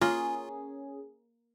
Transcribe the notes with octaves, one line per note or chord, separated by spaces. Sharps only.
A#3 C#4 F4 G#4